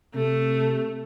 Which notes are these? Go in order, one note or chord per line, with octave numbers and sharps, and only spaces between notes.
C3 A3